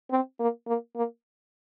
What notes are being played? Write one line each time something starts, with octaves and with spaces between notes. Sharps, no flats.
C4
A#3
A#3
A#3